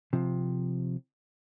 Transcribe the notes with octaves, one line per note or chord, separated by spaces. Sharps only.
C3 F3